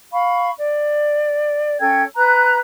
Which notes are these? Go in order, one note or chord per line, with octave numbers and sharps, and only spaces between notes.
F5 B5 C#6
D5
C#4 A4 G5 G#6
B4 A#5 F#6